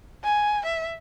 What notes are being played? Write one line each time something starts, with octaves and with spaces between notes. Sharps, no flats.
G#5
E5